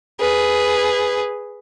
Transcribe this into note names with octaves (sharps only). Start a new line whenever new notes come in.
G#4 B4